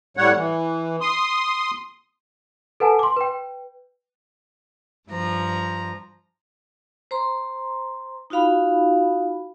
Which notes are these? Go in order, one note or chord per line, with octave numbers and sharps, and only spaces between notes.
A2 G3 C#5 F#5
E3
C6 D#6
A4 B4 F#5 G#5 A5
C6 D6
B4 G5
G2 F3 A#5
C5 A#5 C6
D#4 F4 F#4 F5 B5